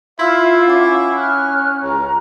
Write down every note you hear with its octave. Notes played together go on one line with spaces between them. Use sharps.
E4 F4 E5 F5 C6 E6 F6
C#4 F#5 D6
F6 F#6
C#2 A#5